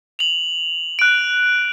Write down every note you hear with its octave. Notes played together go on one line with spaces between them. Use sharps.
F7 F#7
F#6 D7